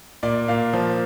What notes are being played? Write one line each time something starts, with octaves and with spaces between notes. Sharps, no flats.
A#2 D5
A#2 F5
F3